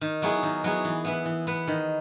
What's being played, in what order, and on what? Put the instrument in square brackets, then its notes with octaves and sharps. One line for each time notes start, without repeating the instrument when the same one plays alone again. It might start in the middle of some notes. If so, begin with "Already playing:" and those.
[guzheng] D#3
F#3 B3 E4 G#4
D#3
F#3 B3 E4 G#4
E3
B3 E4 B4
E3
B3 E4 B4
D#3